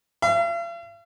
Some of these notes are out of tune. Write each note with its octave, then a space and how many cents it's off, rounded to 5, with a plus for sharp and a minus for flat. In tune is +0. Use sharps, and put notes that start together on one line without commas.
F5 -45